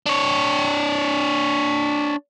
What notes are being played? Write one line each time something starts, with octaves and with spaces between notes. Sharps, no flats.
D4 C#5